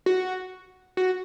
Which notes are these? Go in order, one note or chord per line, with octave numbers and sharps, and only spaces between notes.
F#4
F#4